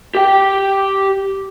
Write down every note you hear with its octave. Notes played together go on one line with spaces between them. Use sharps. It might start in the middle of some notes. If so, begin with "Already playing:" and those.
G4 G5